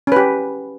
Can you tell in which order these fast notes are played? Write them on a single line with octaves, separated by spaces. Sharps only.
C#4 B4 G4